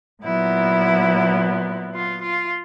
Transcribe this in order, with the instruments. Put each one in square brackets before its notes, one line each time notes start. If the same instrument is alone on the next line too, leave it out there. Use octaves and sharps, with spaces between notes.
[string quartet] A#2 F#3 B3 E4
F4
F4